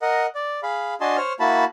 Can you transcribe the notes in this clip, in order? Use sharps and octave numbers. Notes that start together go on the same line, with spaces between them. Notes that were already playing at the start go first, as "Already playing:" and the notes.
A#4 D#5 F#5
D5
G#4 F5 B5
D4 F#4 D#5 G#5 A5 C6
C5 C#5 F6
A#3 E4 F#4 A5 B5